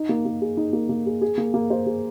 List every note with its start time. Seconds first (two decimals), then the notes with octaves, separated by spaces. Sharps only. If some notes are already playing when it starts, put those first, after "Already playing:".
Already playing: D#4
0.09 A#3
0.25 A#3
0.41 G#4
0.57 D#4
0.73 A#3
0.89 A#3
1.06 G#4
1.21 G#4
1.38 A#3
1.54 A#3
1.70 C5
1.87 G#4